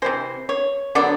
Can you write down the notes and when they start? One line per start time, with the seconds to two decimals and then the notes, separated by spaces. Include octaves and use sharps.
0.02 C3 E3 G#3 C5
0.49 C#5
0.95 D3 F#3 B3 D5